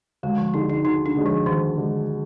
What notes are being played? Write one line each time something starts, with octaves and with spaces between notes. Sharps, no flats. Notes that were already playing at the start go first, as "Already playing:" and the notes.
D2 G#3
F3
D3 G#3 D#4
D#4
D2 D#4
D4
D3 G#3
F3
D2 D#3
D3 G#3